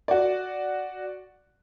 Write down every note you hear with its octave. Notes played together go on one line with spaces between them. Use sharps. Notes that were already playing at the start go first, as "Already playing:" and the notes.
F#4 D5